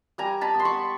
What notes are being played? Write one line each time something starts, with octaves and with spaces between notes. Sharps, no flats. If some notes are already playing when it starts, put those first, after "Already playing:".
G3 G#5 A#5
A5 B5
B3
C6
B5 C#6